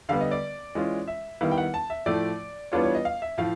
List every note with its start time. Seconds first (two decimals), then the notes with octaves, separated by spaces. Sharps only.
0.09 D3 G3 B3 F5
0.21 D#5
0.31 D5
0.75 E3 G#3 C#4 F4
1.08 E5
1.41 D#3 G3 B3 E4 F5
1.51 G5
1.58 F#5
1.74 A5
1.90 E5
2.06 A2 F3 A3 D5
2.72 E3 G3 B3 D4 F4 C#5
2.83 C#5
2.95 D#5
3.05 F5
3.22 E5
3.38 A2 F3 F5